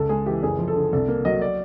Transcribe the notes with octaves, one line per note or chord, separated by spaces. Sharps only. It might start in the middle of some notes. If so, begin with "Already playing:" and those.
Already playing: C#2 A4
G#3 G#4
E3 G4
F#1 G#4
F3
A4
D3
C2 A4
A#3
F#3 D#5
D5